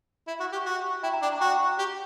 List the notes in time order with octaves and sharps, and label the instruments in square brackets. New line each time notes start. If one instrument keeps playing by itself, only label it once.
[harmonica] E4
F#4
G4
F#4
[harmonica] E4 [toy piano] G5
[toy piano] A#5
[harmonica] D4 [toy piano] G5
[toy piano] A#5
[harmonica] F#4 [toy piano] G5
[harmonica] G4